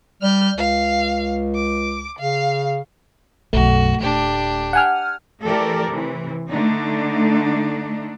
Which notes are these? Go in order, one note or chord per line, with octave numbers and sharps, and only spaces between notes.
G3 F6 G6
C#2 F5
D6
C#3 F5
B1 F#2 A3 F#4
D#1 D4 G4
F#5 G#5 F6
E3 A3 G4 A4 A#4 D5
C3 E3
D3 A3 D4 D#4